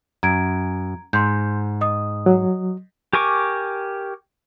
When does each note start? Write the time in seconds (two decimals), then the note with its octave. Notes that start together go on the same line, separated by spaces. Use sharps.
0.23 F#2 A#5 G#6 D7
1.13 G#2 C6 G6
1.81 D#5 D#6
2.26 F#3
3.13 G4 A#4 G#5 C#6 D6